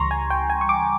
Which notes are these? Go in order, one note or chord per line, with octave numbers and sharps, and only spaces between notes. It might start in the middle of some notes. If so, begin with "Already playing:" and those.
Already playing: C#2 C#3 E3 G3 A#5 C6 C#6
G#5
G5
G#5
C#6
D6